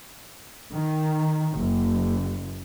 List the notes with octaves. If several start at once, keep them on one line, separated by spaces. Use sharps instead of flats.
D#3
F#1